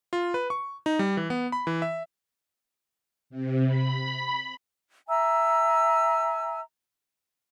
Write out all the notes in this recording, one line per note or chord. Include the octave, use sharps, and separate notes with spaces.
F4
B4
C#6
D#4
G3
E3
B3
B5
E3
E5
C3
B5
E5 G#5 A#5 E6